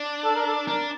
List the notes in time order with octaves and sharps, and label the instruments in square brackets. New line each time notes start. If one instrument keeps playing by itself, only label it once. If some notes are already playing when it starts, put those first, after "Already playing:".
Already playing: [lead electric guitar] D4
[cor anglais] A4
A#4
A4
[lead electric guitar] D4 [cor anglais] A#4